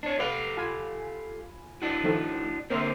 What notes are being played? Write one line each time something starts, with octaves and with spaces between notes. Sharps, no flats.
D4 C#5
G4 A4 B4 F5
F4 G#5 B5
D4 E4 F#4
D#3 F3 A3
D3 A#3 C4 A#4 C5 E5